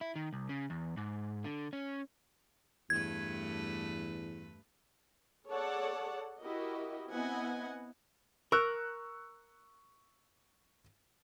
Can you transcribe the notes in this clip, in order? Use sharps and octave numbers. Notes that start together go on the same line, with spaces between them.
E4
D#3
C2
C#3
E2
G#2
D3
C#4
E2 G2 A3 B4 G#6
G#4 A4 C#5 D5 F#5 A5
E4 F#4 G4 A#4 D#5
B3 C4 E4 D#5 F#5 G#5
A#4 C#6 E6 F#6